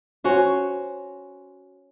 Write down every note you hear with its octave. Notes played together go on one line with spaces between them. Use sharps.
C#4 F#4 C5